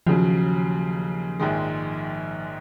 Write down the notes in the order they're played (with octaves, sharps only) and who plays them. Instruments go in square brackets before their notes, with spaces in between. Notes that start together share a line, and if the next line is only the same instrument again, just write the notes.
[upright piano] D#2 C#3 F#3 [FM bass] F3
[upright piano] A#1 G#2 D#3 G#3